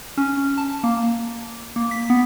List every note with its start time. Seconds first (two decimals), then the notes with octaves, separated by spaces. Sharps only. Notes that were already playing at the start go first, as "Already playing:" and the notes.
0.17 C#4
0.58 A5
0.84 A#3
1.76 A#3
1.91 B6
2.10 B3